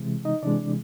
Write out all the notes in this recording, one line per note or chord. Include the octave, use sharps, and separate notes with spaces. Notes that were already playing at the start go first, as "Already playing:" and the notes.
Already playing: C3 E3 G#3
D#4 D#5
C3 E3 G#3 D4 D5